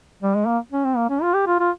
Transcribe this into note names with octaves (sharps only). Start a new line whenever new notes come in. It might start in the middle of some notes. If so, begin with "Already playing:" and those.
G3
G#3
A#3
C#4
C4
A#3
C#4
F4
G4
F4
F4